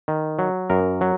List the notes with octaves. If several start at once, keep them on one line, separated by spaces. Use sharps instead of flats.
D#3
F#3
F#2 A#4
F#3